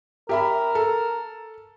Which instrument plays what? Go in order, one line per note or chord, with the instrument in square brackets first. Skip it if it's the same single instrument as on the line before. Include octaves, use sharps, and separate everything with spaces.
[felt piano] G4 E5 B5 [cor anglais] A#4
[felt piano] A4